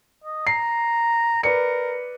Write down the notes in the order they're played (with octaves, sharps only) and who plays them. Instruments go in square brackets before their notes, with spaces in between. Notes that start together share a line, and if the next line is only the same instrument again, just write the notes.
[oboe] D#5
[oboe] A#5 [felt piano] C7
[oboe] A#4 [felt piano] B4 D5 C#7